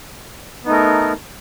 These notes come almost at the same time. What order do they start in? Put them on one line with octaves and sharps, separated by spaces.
B3 D#4 A3 A#4